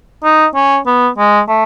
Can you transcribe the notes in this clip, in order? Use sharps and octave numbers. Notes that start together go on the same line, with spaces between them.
D#4
C#4
B3
G#3
A3